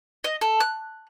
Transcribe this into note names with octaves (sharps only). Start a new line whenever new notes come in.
D#5
A4
F#6